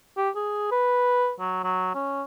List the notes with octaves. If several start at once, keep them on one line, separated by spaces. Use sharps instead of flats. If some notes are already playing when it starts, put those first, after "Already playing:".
G4
G#4
B4
F#3
F#3
C#4